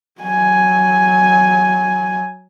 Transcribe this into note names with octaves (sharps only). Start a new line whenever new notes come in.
F#3 G#5